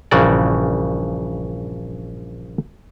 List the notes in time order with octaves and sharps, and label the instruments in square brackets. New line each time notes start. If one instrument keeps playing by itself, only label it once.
[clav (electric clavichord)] A#1 G2 C#3 E3 F#4 D5